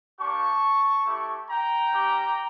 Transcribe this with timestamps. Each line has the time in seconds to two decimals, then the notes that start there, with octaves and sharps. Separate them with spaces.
0.19 A#3 D4 G4 A5 C#6
1.06 A3 E4 G4
1.49 G5 A#5
1.92 C#4 G4